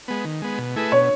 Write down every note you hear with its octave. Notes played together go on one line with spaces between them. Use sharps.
G#3 B3
D#3
G#3 B3
B2
A3 E4 G#4 B4
B2 C#5